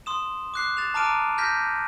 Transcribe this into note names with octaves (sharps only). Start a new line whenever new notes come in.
C6 D#6 E7
D6 F#6 C7
A6 E7 F7
A5 A#5 D6 F6 D7 D#7
F6 G6 A#6 B6